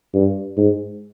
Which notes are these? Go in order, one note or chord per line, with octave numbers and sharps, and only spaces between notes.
G2
G#2